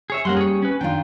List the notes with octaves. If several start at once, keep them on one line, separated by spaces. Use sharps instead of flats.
G#4 C#5 E5
G3 A#3 C#4 A#4 F#5 C6
G#4 C#5
C#4 B4
D#3 D4 F4 G5